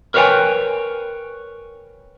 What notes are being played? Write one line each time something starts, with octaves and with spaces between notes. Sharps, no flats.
A#4 B4 C#5 F5 G5 G#5